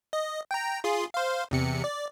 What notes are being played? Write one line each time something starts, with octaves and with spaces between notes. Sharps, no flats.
D#5
G5 A#5
F4 G#4 C6
C5 F5
E2 C3 C#7
D5